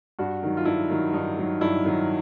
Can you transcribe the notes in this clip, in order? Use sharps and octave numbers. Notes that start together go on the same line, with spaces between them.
G2 F#4
D#3 F#3
F4
G2 E4
D#3 F#3
G2 D#4
D#3 F#3
G2 E4
D#3 F#3